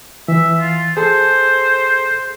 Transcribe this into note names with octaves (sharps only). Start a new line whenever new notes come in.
E3 E5
F4
G#4 A4 C5